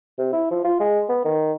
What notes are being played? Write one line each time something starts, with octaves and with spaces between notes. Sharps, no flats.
C3
E4
F3
F4
G#3
B3
D#3